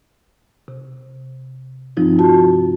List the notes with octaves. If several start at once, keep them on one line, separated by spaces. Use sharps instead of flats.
C3
G2 C3 F3 C4 D#4 F4
F4 F#4 A5